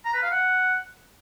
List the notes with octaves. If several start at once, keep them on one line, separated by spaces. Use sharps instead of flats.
A#5
B4
F5
F#5